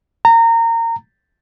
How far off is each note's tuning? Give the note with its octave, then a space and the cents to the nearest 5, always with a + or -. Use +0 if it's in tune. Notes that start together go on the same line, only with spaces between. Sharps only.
A#5 -25